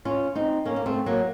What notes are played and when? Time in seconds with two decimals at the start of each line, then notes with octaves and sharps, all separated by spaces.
0.05 C#4 F4
0.35 C4 D#4
0.65 A#3 C#4
0.76 A#3
0.86 A3 C4
1.06 F#3 A#3